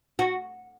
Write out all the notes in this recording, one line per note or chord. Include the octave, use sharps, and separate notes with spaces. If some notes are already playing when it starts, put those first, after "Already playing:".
F#4